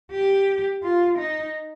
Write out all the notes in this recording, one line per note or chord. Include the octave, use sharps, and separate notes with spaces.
G4
F4
D#4